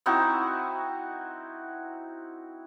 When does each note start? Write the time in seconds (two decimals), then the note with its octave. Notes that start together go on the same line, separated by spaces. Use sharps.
0.06 C4 D#4 E4 F#4